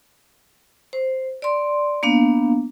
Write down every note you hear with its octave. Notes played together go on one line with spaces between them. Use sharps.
C5
D5 C6
A#3 B3 D4 F5